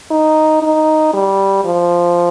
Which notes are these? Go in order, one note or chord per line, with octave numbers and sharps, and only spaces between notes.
D#4
D#4
G3
F3